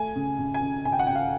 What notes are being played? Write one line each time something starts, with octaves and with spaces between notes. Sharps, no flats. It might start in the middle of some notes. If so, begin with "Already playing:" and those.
Already playing: A3 G#5
C#3
C#3
G#5
C#3
C#3 G#5
G5
F#5
C#3 G5
F5